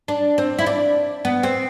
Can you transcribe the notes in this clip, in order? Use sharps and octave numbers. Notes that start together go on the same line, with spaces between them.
D4
C4
E4
D4
B3
C4